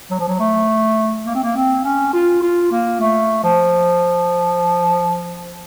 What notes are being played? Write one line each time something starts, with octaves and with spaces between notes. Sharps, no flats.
F#3
F3
F#3
A3
A#3
C4
A#3
C4
C#4
F4
F4
A#3
A3
F3